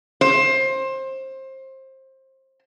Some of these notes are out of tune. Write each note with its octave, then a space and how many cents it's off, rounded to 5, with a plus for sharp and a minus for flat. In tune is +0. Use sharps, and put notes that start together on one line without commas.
C5 +25